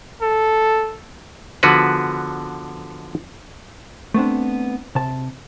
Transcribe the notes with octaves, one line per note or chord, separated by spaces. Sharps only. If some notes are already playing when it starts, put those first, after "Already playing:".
A4
D3 F3 B3 F#4 G#4 B4
A3 B3 C4 D4
C3 A5